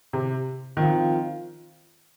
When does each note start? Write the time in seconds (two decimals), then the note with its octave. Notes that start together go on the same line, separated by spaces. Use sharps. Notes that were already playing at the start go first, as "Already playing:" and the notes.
0.13 C3
0.77 D#3 F3 C4 F4